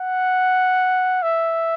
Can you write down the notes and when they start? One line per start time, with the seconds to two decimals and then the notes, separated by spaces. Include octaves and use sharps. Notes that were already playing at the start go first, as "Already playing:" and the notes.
Already playing: F#5
1.22 E5